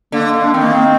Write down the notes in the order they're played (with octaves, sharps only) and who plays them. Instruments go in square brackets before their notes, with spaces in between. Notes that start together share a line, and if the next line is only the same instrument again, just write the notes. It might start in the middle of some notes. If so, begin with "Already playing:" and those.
[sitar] D3 [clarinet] A#3
[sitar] D3
[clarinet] D4
[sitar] D#3 [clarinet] C4
[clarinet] A#3
C4